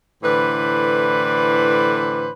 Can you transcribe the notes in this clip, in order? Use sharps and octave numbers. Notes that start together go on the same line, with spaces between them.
A2 D3 E3 B4 C5 D5